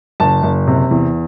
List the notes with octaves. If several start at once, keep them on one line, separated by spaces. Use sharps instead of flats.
F#1 A5
F#1
C3
E2